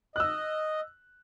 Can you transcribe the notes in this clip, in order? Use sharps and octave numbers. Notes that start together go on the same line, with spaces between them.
D#5 E6 F#6